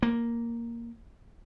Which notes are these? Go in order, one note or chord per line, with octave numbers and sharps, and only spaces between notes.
A#3